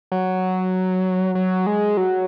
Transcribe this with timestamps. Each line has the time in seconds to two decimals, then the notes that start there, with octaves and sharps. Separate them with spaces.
0.12 F#3
1.35 F#3
1.67 G#3
1.97 F#3